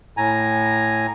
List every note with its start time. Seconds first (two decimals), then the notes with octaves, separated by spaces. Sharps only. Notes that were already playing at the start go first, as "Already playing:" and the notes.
0.17 A2 G#5 A#5